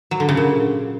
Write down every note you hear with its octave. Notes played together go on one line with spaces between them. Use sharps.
F#3
D3
C#3
A#2